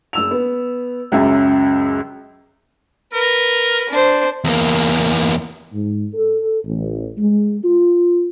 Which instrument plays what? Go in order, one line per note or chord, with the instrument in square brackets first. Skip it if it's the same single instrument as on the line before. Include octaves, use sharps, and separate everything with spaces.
[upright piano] F#1 E6 F7
B3
C#2 F#2 C#3 E5
[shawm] A#4 [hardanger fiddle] B4
[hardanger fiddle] D4 C5
[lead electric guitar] E2 A#3
[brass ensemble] G#2
A4
A1
G#3
F4